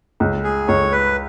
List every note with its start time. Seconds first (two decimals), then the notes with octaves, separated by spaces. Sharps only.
0.20 C#2
0.44 G#4
0.68 C#2 C#5
0.92 B4